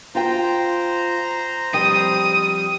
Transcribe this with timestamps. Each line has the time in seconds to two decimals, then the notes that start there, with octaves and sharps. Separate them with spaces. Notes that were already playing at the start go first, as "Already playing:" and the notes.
0.15 F4 C5 F5 G5 A#5
1.73 F2 G3 G5 D#6